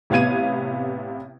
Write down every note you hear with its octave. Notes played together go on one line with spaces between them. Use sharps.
A1 C3 B3 F5 G#6 D#7